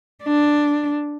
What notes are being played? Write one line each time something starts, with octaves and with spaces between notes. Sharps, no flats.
D4